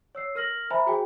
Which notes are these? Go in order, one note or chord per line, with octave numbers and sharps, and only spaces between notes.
C#5 E6 C7
A#4 F6 A#6 F#7
C5 E5 G#5 A#5 B5
F#4 G#4 G5 G#5